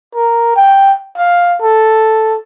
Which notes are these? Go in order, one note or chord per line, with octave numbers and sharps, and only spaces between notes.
A#4
G5
F5
A4